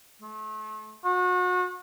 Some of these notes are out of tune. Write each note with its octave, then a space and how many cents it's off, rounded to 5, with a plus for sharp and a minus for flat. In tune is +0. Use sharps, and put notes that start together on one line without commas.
A3 -35
F#4 -35